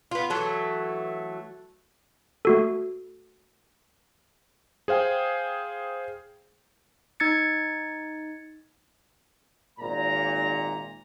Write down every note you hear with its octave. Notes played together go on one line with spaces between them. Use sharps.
B3 F4
E3 F#3 A3
A3 F#4 A4
G#4 C5 F5 G5 G#5
D#4 G#6 A6 C#7
G#1 A#2 A#5